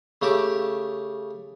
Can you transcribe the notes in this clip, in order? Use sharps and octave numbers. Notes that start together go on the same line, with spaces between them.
C#3 A3 G4 A5 D6